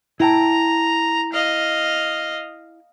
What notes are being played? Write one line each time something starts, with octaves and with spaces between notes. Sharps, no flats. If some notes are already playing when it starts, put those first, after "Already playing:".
E4 G5 A5 A#5
D#5 F5